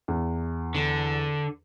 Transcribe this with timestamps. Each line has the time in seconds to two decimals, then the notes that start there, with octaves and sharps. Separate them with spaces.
0.08 E2
0.75 D3